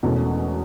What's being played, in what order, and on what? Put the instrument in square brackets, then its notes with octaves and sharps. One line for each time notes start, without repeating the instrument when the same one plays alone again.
[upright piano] E1 E2 B2 A3 C#4